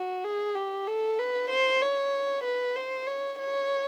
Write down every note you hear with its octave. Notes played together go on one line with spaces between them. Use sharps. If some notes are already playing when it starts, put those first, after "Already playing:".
Already playing: F#4
G#4
G4
A4
B4
C5
C#5
B4
C5
C#5
C#5